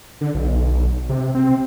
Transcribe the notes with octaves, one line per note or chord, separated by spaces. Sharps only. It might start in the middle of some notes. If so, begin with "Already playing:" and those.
D3
B1
C3
C4